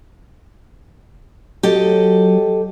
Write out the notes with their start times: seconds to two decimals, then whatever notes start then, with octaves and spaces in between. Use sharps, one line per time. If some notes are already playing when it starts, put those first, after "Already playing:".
1.63 F#3 G4 A4 D#5